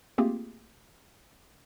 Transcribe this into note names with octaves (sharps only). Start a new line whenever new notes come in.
A3 A#3 C4 F4 G4 G#4